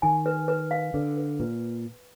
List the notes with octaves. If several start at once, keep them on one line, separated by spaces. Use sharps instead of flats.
D#3 G#5
B4
B4
F5
D3 B4
B4
A#2 B4